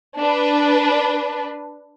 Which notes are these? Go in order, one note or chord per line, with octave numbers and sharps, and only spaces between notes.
D4 B4